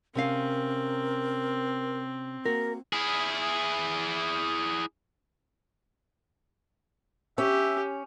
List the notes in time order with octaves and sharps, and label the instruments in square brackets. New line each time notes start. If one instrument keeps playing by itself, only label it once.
[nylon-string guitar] C3 C#4 F5 [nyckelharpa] C4 [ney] A#4
[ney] A#3 [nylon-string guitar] F#4 [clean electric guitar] A#4
[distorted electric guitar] E4 G#4
[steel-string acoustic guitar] C#4 [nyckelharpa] G4 [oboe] E5